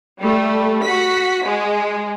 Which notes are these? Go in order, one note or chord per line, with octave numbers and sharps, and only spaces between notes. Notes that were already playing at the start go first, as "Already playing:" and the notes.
G3 A3
F#4 B6
G#3